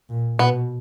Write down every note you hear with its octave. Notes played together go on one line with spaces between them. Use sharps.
A#2
B2 B3